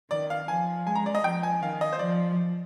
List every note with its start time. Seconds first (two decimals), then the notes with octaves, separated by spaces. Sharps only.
0.11 D#3 D5
0.30 F5
0.48 F3 G#5
0.87 G#3 G#5
0.95 A#5
1.06 D5
1.15 D#5
1.24 F3 G5
1.43 G#5
1.62 D#3 F5
1.81 D#5
1.93 C5
1.99 F3 D5